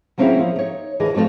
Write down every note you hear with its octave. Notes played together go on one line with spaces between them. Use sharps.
F#3 A#3 C4 C#4 E4 G#4
F3
D#4 C#5
D#2 D3 E3 G#4 B4 D#5
F3 G#3 A3 C4 F#4